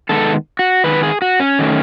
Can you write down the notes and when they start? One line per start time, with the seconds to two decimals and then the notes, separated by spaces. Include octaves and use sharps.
0.09 D#3 G#3 B3 A4
0.59 F#4
0.84 D#3 G#3 B3 B4
1.03 G#4
1.22 F#4
1.40 C#4
1.59 D#3 F#3 A3